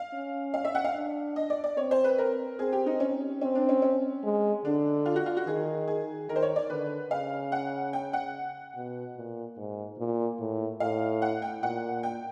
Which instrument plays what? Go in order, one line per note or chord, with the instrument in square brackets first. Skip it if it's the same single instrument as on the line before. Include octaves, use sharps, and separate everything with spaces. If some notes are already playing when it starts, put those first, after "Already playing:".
Already playing: [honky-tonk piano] F5
[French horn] C#4
[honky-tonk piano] F5
E5
F#5
F5
[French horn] D4
[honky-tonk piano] D#5
D5
D5
[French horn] C4 [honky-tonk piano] C#5
[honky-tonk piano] C5
B4
A#4
[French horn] C4 [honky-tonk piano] G#4
[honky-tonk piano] G4
D#4
C#4
[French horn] C4 [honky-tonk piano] C#4
[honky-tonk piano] D4
C#4
C#4
[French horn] G#3
[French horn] D3 [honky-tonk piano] D4
[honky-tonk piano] F4
F#4
F4
F#4
[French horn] D#3 [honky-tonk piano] G#4
[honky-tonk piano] G#4
[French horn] D#3 [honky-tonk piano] A#4
[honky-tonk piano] C5
C#5
D5
[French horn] D3 [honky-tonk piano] B4
[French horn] C#3 [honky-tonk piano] F5
[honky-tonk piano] F#5
G5
F#5
[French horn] B2
A#2
G#2
A#2
A2
[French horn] A2 [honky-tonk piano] F5
[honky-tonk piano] F#5
G5
[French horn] A#2 [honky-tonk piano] F#5
[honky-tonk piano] G5